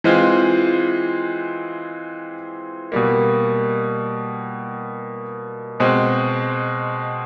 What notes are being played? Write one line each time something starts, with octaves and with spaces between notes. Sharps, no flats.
E3 G#3 C4 F4
B2 G3 A#3
B2 G#3 C4